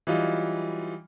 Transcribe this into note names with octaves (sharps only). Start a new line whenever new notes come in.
E3 F#3 G3 D#4 F4